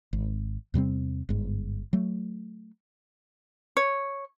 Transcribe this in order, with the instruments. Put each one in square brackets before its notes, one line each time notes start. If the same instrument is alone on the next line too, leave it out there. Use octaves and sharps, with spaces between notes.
[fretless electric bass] G#1
E2 C3 G3 C4
G1 G#2
F#3 A3
[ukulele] C#5